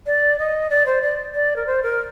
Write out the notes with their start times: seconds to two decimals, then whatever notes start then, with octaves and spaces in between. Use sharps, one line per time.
0.06 D5
0.38 D#5
0.70 D5
0.86 C5
1.01 D5
1.34 D5
1.56 A#4
1.66 C5
1.82 A#4